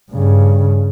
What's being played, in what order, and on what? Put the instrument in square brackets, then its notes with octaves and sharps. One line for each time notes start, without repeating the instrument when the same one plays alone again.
[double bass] G2 C#3